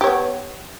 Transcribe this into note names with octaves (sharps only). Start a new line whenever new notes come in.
B3 G4 C#5